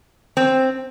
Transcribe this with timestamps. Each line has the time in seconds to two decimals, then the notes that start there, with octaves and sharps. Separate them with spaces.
0.37 C4